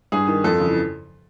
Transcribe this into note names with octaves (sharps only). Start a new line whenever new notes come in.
G2 G#4
D#3
F2 A4
C#3 E3